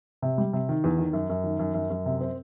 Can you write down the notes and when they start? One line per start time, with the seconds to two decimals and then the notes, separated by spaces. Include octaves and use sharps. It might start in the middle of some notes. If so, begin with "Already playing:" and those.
0.22 C3
0.38 G3
0.53 C3
0.69 D#3
0.84 E2
0.98 D#3
1.13 F#2
1.29 F#2
1.44 D#3
1.59 F#2
1.74 F#2
1.90 F#2
2.06 C3
2.21 C4